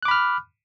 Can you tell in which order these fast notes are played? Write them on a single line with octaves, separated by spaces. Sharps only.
F#6 D6 B5 F6